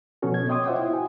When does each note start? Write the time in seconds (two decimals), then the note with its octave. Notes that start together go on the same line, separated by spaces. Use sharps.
0.22 B2 F3 B3 C#4 F#4 A4
0.34 B2 G#6
0.49 C#5 D#5 G5 C6 D6 D#6
0.66 F4 C5 E5 F#5 G5
0.79 E4
0.93 F#4 G#5